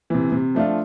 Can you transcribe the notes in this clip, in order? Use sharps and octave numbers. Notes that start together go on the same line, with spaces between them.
C3 E3
C3
F3 A3 D4 F4